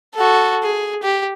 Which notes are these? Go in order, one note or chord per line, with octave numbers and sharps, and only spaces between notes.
F#4 A4
G#4
G4